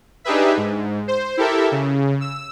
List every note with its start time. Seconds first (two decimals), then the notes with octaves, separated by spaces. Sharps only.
0.24 D4 D#4 G4 G#4 B4 E5
0.57 G#2
1.08 C5
1.37 E4 G4 A4 A#4 E5
1.71 C#3
2.21 E6